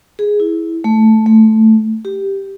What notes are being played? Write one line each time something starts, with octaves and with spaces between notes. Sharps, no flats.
G#4
E4
A3
A3
G4